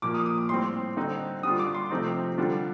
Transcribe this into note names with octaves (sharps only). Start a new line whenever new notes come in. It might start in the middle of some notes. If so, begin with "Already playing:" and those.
A#2 F3 A#3 D6
D#6
D#6
D6
A2 G3 C4 C6
D3 G3 C4 D#4
D3 G3 D4 F4 D#6
D6
C6
C3 F3 A3 C4 D#4
D3 G3 D4 F4